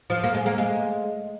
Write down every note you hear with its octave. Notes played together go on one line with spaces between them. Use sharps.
F3
A#3
G#3
A#3
G#3